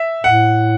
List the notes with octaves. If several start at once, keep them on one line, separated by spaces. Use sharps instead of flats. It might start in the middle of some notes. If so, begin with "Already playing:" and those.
Already playing: E5
A2 F#5